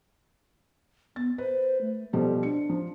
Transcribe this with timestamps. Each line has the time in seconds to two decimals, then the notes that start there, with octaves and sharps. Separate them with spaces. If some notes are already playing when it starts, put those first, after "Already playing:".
1.16 B3 A6
1.38 B4 C5
1.81 A3
2.13 B2 F3 G3 A4
2.43 D4 C#7
2.69 F3